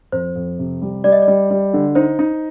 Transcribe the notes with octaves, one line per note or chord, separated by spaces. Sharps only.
F2 C5
F2
C3
G3
G3 D5
D#5
D5
G3
G3
D3
D#4 C5
D#4